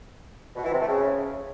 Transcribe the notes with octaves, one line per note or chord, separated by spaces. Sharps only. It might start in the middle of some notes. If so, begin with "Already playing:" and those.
B2
E3
C3
A3
C#3